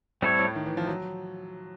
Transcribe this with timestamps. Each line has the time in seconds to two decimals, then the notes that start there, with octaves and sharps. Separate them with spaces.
0.22 A2 G3 C4 E4 A4 C#5
0.39 A2
0.55 D#3
0.66 E3
0.77 F3
0.87 F#3